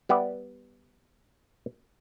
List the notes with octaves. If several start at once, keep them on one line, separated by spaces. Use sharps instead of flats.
G3 B3 D5 E5